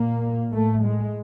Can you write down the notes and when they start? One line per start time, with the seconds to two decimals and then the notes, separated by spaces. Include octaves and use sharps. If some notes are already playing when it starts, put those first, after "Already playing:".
Already playing: A#2 A#3
0.53 A2 A3
0.84 G#3